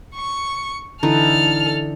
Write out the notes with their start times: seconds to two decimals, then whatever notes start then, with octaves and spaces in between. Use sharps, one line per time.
0.15 C#6
1.03 D3 E3 D#4 A4 F6